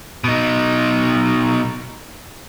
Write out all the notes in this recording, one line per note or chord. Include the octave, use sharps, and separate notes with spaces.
B2 D#4